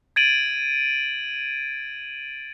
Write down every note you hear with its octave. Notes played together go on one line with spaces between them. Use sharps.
G#6 A6 D7 D#7 F#7